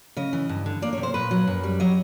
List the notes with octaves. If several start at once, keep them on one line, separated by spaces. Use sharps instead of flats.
C#3 D#5
E3
G2
D3
A#3 D5
C#5
C3
C5
A#2 B4
F#3
F#2
G3
F#3 D#5